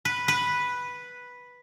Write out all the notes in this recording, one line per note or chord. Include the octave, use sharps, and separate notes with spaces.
B4
B4